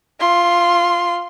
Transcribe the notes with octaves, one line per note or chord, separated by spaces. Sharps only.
F4 C6